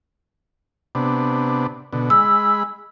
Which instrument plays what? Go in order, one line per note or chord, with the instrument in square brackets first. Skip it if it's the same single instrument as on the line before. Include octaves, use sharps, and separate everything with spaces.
[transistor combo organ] C3 B3 D4
B2 D3
[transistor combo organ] G#3 B5 [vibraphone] E6